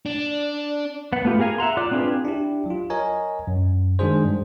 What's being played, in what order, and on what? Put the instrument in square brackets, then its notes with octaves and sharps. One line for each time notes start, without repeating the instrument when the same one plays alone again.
[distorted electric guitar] D4
[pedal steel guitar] B3 F#5
A3 B3 F4 G4
G#4 A#4 F5 G#5
E5 F#5 A#5 C6
F4 D5 D6 F#6
C4 D4 F4 G#4 B4
[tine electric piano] D4 E4 G4
F#3 F4
A#4 C#5 D#5 G#5 A#5
F#2
D#3 G#3 D4 F#4 G#4 C5
G2